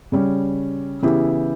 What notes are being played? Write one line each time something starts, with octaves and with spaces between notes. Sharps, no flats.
C#3 G3 C#4
C#3 E3 B3 E4 G4